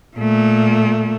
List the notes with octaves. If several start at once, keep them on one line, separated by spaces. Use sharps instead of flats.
A#2 A3